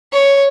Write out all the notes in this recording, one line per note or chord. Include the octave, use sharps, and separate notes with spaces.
C#5